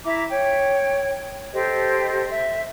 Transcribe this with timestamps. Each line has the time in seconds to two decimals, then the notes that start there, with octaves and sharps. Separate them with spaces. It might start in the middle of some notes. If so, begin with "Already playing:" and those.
0.04 E4 E5 A#5 D6
0.29 C#5 G5
1.53 G4 A4 C5 D#5
2.30 E5